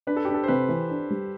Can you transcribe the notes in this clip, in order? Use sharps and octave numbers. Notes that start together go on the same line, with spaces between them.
D4 B4
A4
D4 G4
A4
C5
C3 B4
E3
D4
G3